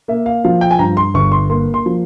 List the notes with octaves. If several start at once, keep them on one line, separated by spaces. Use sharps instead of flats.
A#3 E5
F5
F3 F5
G5
G#5
G2 A#5
C6
G1 C#6
C6
A#3 C6
C6
F3